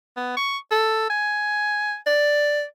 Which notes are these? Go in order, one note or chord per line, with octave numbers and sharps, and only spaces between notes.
B3
C#6
A4
G#5
D5